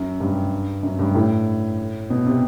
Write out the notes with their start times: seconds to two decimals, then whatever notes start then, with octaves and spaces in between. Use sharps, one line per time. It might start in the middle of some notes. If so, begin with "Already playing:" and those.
Already playing: F#2
0.20 G2
0.83 F#2
0.99 G2
1.15 A2
2.10 B2
2.26 C3